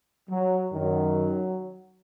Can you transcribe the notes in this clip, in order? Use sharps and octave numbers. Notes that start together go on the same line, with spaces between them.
F#3
F#2 D#3 F#3